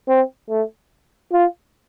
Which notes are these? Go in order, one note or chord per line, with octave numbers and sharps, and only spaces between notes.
C4
A3
F4